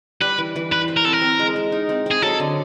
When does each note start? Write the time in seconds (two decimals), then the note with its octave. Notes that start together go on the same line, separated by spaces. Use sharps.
0.21 G3 B4
0.38 E3
0.56 E3
0.71 E4 B4
0.88 C5
0.97 A#4
1.05 C4 A4
1.13 A#4
1.22 C4
1.39 G#3
1.56 G#3
1.72 D#4
1.89 C4
2.06 C4 G#4
2.22 F#3 A4
2.40 D3